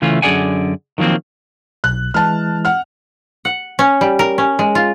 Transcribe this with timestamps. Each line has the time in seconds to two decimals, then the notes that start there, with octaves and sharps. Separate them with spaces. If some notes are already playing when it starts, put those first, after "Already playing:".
0.02 C#3 E3 A3 C#4 F4
0.22 F#2 D3 G#4 D5 F#5 G#5
0.98 D#3 F3 F#3 A#3 C4
1.84 B1 F#6
2.14 E3 G#3 E4 A5 F6
2.65 F#5 F6
3.45 F#5
3.79 C#4
4.01 G3
4.19 A#4
4.38 C#4
4.59 G#3
4.75 F4